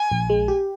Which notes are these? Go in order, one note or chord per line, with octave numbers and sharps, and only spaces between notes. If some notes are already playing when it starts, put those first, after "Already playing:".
Already playing: G#5
A#1
G#3
G4